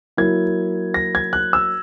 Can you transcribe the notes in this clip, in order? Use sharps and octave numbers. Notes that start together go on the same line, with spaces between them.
F#3 A#3 E4 G#6
A#6
G#6
F#6
E6